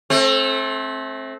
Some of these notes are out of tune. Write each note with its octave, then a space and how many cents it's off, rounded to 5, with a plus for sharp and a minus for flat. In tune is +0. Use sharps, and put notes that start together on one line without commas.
A3 -20 C4 +30